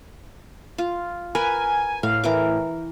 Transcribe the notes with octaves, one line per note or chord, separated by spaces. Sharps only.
F4
A#4 B4 G#5
A2 F5
E3 A#4 D6